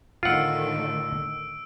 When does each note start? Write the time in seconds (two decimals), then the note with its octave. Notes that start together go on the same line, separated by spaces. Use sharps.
0.23 A2 D3 D#3 F4 F#5 E6 D7